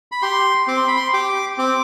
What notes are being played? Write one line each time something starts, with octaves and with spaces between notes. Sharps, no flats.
B5
G4 C6
C4 D6
C6
B5
C6
G4 D6
C4 D6